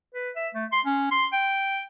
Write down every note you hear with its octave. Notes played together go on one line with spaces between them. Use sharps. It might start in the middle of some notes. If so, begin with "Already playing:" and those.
B4
E5
A3
C6
C#4
C6
G5